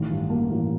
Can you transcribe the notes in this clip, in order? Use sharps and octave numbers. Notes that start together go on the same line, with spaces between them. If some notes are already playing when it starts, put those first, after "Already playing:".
Already playing: A1 D#3
G2
A#3
A1